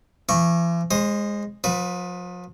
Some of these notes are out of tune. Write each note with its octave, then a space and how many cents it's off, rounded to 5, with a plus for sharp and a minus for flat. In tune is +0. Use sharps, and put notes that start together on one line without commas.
E3 +45 C#6 -10
G#3 -10 C5 +30
F3 +40 B4 +0